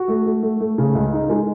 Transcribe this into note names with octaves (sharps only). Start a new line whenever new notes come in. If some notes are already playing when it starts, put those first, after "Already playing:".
Already playing: F#4
A3
A3
A3
A3
C#3
C#2
D#4
G#3